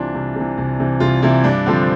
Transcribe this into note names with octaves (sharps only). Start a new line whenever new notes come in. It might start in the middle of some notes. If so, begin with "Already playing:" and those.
Already playing: C2 C3 E3 D4 F4
C2
C3 E3
C2
C3 E3
C2 F4
C3 E3 E4
G2 D4
D3 F3 C4